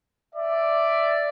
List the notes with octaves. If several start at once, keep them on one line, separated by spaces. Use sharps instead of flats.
D5 E5